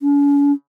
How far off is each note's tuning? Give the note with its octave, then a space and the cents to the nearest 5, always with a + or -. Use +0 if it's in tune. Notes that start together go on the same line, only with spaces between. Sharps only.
C#4 +45